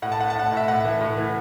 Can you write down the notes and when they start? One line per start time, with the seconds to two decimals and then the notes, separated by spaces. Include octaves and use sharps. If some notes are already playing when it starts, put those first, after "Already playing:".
0.02 A2 F#5
0.12 A5
0.19 A3 F#5
0.30 A5
0.35 A2 F#5
0.52 A2
0.57 E5
0.68 A2 F#5
0.84 E3
1.01 A2
1.17 E3